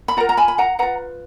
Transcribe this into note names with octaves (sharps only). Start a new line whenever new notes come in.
B5
F4 A#4 F#5 A#5
A#5
G#5 B5
B5
F#5 A#5
F4 B4 F#5 A#5